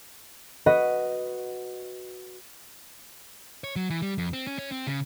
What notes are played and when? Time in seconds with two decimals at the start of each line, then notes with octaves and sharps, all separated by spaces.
0.66 F#4 B4 D#5
3.64 C#5
3.76 F#3
3.90 E3
4.02 G3
4.18 F2
4.33 C4
4.47 C#4
4.59 C#4
4.72 C4
4.87 C#3